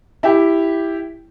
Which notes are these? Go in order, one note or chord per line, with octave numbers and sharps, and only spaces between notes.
E4 G4